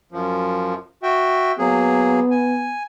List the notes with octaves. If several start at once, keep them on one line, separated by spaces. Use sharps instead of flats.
F#2 F3
F#4 E5 G5
F#3 A#3 B3 G#4
G#5